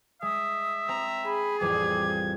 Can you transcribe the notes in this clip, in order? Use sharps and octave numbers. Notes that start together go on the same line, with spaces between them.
G#3 E5 D#6
C4 A#5
G#4 B5
A1 F2 G3 D6 G#6